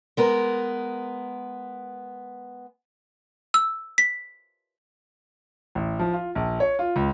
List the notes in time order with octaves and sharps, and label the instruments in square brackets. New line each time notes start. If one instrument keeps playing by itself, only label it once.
[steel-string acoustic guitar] G#3 B3 A#4
[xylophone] E6
B6
[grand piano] A1
F3
F4
A#1
C#5
F4
C#2